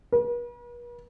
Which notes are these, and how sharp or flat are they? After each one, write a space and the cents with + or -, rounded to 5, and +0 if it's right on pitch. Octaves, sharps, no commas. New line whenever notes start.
B4 -45